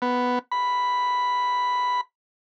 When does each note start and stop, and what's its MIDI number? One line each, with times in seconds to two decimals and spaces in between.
0.02 0.39 59
0.52 2.01 83